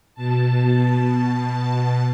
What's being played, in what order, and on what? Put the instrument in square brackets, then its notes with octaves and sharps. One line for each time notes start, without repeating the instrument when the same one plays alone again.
[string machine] B2 A5